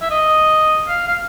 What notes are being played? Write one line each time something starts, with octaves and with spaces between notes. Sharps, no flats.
E5
D#5
F5
F5